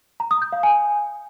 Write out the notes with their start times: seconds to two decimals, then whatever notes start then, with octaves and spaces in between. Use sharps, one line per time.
0.20 A#5
0.31 D#6
0.42 G6
0.52 F5
0.63 G#5